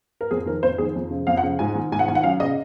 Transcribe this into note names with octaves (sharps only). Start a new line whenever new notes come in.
A#4
F2 G#4
D#3 A#4
F2 C5
D#3 G#4
F2
C#3
F2 F5
F#5
C#3
G#2 G#5
D#3
G#2 G#5
F#5
D#3 G#5
F#5
F#2 F5
C#3 D#5